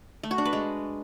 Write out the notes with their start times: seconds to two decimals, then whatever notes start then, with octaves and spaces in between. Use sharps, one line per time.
0.23 A3
0.31 F#4
0.38 D4
0.45 B4
0.53 G#3